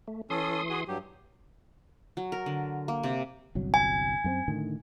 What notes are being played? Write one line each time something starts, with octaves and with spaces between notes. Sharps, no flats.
A3
E3 C#4 A4 C6 D#6
F#4 G#4
G2 F#3 G4
F#3
A#4
D3
A#3
C3
G1 C2 F#3
G#5
F#2 A#3 C4
A2 D3 D#3